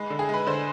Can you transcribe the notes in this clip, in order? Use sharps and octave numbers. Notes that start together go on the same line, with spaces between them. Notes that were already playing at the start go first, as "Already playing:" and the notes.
Already playing: G#3 B4
D3
G#4
G#3 B4
D3 C5